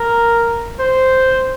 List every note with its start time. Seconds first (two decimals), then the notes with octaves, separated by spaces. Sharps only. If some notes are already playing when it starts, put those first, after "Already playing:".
Already playing: A#4
0.79 C5